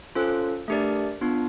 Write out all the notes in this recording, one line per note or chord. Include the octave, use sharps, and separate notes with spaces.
C#4 F4 A4 C5
A3 D4 G4 A#4 D5
B3 D4 F4